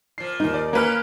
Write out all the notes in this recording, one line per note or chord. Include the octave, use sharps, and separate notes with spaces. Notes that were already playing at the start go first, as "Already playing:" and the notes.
A#2 F3 C7
D#2 D#4
D5
A#3 C#4 A#4 B4 F6